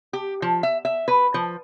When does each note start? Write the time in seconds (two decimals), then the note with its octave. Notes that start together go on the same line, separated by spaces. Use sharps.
0.13 G4
0.42 F3
0.63 E5
0.85 E5
1.08 B4
1.34 F3